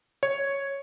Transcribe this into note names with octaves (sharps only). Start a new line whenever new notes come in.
C#5